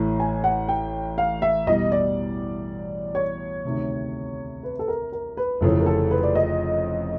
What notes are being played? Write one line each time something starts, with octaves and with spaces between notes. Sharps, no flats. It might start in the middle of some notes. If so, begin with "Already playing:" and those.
Already playing: A1 A2 E3 A3
G#5
F#5
G5
F5
E5
E2 B2 G3 D#5
D5
C#5
D2 C3 D#3
B4
A4
A#4
A#4
B4
F1 F2 C#3 E3 A4
A#4
A4
B4
D5
D#5